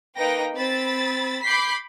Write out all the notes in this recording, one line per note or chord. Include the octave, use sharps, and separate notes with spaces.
A#3 D#4 B4 G5 A#6
C4 B5 E6 A6
B5 D6 G6 B6 C7